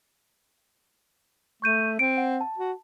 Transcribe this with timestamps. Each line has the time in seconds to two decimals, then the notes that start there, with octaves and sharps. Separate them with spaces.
1.62 A3 C#6 G6 D#7
1.99 C4 D7
2.17 F#5
2.41 A5
2.58 F#4